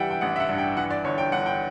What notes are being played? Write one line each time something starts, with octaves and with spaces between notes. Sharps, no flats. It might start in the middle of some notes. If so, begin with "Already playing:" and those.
Already playing: E3 G3 E5 F#5 G5
G5
A1 F#5
E5
F#5
G2
G5
E3 F#5
D5
G1 C#5
G5
G1 F#5
G5